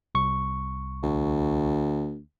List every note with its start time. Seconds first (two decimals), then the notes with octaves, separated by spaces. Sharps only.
0.15 C2 C#6
1.03 D2